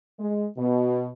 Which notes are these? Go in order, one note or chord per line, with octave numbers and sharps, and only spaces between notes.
G#3
B2